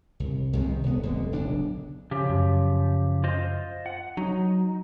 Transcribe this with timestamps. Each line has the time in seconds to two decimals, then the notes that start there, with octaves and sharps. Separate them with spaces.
0.20 C2
0.53 C2 C3 D#3 G#3
0.83 D#1 A2 B3
1.03 F1 D3 G#3
1.32 D1 B1 C#3 D4
2.11 C#3 F3 G4
2.30 F#2
3.24 F4 C5 D#5
3.86 F#5
4.17 F#3 D#4